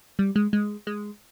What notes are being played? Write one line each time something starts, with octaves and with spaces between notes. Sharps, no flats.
G3
G#3
G#3
G#3